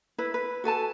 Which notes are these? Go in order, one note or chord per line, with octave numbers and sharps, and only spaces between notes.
E4 B4
B4
F#4 A4 G#5 A5